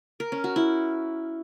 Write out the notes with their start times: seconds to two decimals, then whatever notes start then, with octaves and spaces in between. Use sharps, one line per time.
0.20 A#4
0.32 C#4
0.44 F#4
0.56 E4